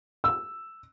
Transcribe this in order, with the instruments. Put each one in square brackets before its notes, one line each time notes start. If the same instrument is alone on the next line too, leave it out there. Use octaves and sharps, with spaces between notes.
[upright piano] E6